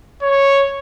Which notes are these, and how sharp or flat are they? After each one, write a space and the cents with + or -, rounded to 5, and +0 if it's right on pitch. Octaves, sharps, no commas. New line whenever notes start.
C#5 -5